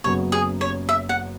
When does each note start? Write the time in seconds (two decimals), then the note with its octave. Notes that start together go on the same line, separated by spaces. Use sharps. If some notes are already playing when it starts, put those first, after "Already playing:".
0.04 F#1 F#2 C#3 F#3 B3 C#5
0.32 G#4
0.61 C#5
0.89 E5
1.09 F#5